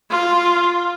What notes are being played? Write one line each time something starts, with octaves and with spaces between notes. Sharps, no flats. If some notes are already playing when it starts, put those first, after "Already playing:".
F4